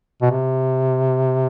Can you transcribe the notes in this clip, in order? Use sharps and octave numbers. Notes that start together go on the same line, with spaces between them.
B2
C3